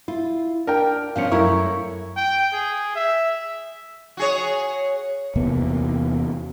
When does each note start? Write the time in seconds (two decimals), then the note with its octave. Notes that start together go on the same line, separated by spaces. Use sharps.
0.08 E4 F4
0.67 D4 A#4 G5
1.16 B2 F3 C#4 F5 C#7
1.32 F#2 A3 E4 A#4 C#6
2.17 G5
2.52 G#4
2.95 E5
4.17 F#4 G#4 C#5
5.36 E2 C3 A#3 B3